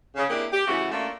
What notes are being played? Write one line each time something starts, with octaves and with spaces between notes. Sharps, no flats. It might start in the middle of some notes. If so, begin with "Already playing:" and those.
C#3
A#3 C4 D4 E4 G4 G#4
G4
C#3 E3 A3 B3 F#4
A3 A#3 C#4 D4 F4 A4